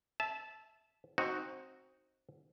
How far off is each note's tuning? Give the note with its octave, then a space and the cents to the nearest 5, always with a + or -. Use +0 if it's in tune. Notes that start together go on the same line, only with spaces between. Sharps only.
E5 +0 A5 -20
C4 +20 D#4 +0 F#4 +0